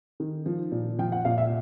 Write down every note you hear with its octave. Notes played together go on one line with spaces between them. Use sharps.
D#3
F3
A#2
F3 G5
F#5
A#2 F5
E5